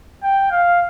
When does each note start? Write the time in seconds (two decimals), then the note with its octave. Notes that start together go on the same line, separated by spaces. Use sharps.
0.24 G5
0.52 F5